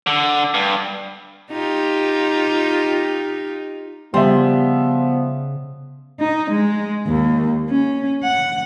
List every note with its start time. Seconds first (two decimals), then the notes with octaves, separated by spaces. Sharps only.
0.07 D3
0.54 G2
1.51 D#4 F4 G4
4.14 C#3 F3 G3 B3 E5 C6
6.20 D#4
6.51 G#3
7.07 D#2
7.69 C#4
8.24 F#5